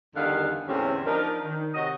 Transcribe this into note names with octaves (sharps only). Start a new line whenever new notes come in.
E2 D3 D#3 G3 F5 F#5
E2 A2 D3 C4 C#4 G4
F3 D4 D#4 A#4
D#3
C3 F#4 C#5 D#5